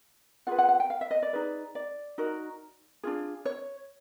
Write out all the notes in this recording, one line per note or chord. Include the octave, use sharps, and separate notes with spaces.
F4 G#4 B4 F#5
F#5
F#5
G5
F5
E5
D#5
D5
D#4 G#4 B4
D5
D#4 F#4 A#4
D4 F4 G#4
C#5